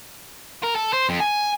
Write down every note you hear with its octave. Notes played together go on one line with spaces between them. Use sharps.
A#4
A4
C5
F2
G#5